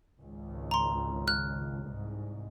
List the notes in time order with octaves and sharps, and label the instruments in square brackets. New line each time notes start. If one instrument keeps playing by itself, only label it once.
[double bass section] G#1 C#2
[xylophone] A#5 C6
F6 F#6
[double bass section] C2 G#2